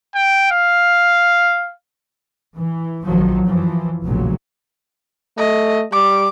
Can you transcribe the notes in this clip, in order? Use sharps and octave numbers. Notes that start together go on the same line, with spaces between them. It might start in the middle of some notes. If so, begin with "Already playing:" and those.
G5
F5
E3
A#1 D#3 F3 F#3
F#2 E3 F3
F1 B1 A#2 C#3 F#3
A3 D#5
G3 D6